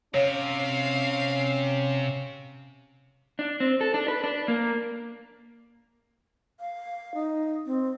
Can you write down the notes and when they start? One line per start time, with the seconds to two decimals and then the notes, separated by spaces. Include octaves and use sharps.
0.14 C3 C#4 C#5 F5
3.39 D4
3.60 C4
3.81 A4
3.94 D4
4.08 B4
4.24 D4
4.48 A#3
6.60 F5
7.14 D#4
7.66 C4